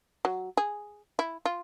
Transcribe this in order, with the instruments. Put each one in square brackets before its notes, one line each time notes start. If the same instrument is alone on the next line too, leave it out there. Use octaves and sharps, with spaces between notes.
[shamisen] F#3
G#4
E4
F4